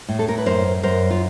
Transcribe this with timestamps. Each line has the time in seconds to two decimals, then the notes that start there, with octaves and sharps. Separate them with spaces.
0.09 A2
0.19 A4
0.28 A#4
0.38 B4
0.46 F#2 A#4 C5
0.83 F#2 A#4 C5
1.10 F4